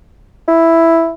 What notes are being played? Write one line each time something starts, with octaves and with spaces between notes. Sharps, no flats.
E4